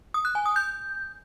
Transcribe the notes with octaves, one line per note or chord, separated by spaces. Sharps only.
D#6
F#6
G#5
D#6
G6